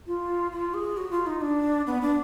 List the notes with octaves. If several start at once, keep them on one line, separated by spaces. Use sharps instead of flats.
F4
F4
G#4
F#4
F4
D#4
D4
B3
D4